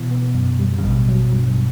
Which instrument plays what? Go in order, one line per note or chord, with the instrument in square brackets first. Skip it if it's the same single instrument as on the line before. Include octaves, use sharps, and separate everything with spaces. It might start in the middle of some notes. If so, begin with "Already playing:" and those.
Already playing: [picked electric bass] B2 [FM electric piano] E3
[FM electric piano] B3
F#2
G3
[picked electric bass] C#3
[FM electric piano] A1 [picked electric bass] B2
[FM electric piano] F#3
G2